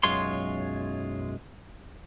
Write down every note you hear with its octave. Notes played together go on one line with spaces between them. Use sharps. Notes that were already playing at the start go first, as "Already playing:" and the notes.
B1 F#2 G#3 F4 C#5 C6